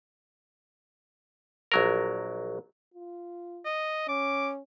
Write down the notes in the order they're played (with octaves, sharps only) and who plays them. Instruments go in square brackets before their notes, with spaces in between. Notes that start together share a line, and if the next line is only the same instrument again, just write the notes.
[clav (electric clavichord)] A#1 F#3 A#4
[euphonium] F4
[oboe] D#5
[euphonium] C#4 [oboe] D6